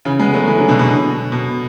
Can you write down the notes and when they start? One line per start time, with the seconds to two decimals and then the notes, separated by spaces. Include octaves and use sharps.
0.05 C#3 E3
0.19 G#3 B3
0.33 F#3 A3
0.47 E3 G#3
0.58 D3 F#3
0.68 B2 D3
0.79 B2
1.32 B2